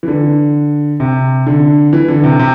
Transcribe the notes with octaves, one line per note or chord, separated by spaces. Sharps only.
E3
D3
C3
D3
E3
D3
C3
C3